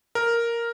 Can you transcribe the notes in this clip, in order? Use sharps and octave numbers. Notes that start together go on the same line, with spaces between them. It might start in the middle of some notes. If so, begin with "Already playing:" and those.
A#4